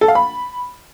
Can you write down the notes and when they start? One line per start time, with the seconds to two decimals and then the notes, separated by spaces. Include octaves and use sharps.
0.01 A4
0.08 F5
0.15 B5